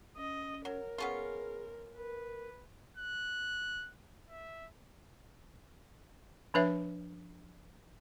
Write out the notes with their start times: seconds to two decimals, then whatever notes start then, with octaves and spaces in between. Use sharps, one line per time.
0.17 C#4 D#5
0.65 F#3 A#4
0.98 B3 C#4 F4 G#4
1.97 A#4 B4
2.97 F#6
4.29 E5
6.54 F3 D4 B4 C#5 E5